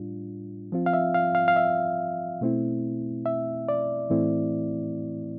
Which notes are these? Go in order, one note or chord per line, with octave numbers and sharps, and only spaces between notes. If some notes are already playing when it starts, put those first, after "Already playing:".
Already playing: A2 G3 D4 F4
F3 C4 F4
F5
E5
F5
F5
F5
E5
B2 A3 C4 E4
E5
D5
A2 E3 A3 C4 E4